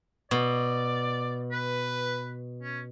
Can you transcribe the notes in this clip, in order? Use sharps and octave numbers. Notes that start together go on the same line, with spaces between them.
B2 D5
B4
C#4